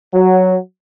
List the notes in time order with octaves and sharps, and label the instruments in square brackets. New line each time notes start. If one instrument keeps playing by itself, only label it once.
[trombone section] F#3